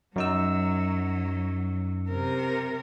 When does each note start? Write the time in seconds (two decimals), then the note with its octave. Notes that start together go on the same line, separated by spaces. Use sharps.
0.16 F#2 F#3 D#4 E6
2.09 C3 A#4